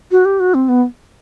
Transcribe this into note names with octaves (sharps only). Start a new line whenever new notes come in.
F#4
G4
F#4
C4
B3